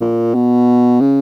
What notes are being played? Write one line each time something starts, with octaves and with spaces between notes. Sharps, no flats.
A#2
B2
C#3